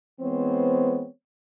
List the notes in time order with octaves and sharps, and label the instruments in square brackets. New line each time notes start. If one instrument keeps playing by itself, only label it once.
[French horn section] E3 G#3 B3 C4 C5 C#5